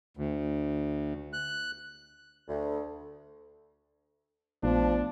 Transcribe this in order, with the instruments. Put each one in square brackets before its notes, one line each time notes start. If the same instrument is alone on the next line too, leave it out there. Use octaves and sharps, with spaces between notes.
[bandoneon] D2
F#6
[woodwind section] D2
[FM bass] A#1 [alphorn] F3 [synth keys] A3 B3 [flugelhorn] D4